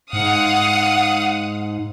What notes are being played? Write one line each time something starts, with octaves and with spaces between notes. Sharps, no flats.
G#2 F5 F#5 D#6